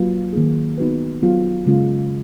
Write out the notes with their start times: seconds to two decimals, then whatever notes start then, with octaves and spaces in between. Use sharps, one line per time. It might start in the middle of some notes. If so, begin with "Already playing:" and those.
Already playing: F#3 A#3 F4 B4
0.33 D#3 A#3 D#4 G#4
0.78 B3 D#4 F#4 B4
1.22 F#3 B3 F4 G#4
1.66 C#3 G#3 C#4 F4